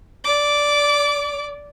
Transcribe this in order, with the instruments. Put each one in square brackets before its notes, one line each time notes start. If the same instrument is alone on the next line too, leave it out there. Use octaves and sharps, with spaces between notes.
[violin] D5 D6